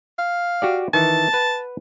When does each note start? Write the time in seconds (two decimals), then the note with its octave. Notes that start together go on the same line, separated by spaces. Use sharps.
0.19 F5
0.62 F#4 G4 D5
0.94 D#3 E3 A5
1.34 B4 F#5